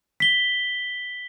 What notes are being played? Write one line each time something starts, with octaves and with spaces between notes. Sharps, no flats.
B6 G7